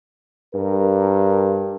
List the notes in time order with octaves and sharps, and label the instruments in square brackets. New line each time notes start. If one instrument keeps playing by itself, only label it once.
[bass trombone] G2 [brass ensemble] A#4